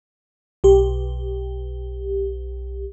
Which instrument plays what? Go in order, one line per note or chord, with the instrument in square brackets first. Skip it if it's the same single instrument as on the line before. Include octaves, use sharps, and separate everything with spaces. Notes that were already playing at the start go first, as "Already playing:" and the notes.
[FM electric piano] B1 G4